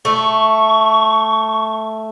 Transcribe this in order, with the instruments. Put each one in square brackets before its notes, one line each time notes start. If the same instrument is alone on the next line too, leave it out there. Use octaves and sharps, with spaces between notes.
[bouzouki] A3 [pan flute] C#6